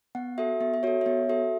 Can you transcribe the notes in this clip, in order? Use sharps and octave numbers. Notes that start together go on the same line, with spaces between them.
B3 F#5
F#4 A4 E5
B3 E5
E5
F#4 A4 C#5
E5
B3 C#5
F#4 A4 E5